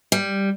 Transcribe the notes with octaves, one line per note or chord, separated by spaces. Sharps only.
G3